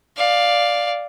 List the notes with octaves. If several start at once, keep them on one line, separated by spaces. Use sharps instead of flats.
D5 F5